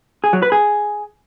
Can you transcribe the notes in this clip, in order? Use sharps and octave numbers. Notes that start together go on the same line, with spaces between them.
G#4
F#3
B4
G#4